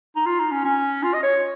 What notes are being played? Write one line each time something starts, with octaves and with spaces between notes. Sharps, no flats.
D#4
F4
D#4
C#4
C#4
F4
D#5
C#5